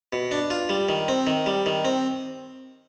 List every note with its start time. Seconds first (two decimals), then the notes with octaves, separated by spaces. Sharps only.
0.13 B2
0.31 D4
0.50 F4
0.69 G3
0.89 D#3
1.08 C4
1.27 D#3
1.46 G3
1.66 D#3
1.85 C4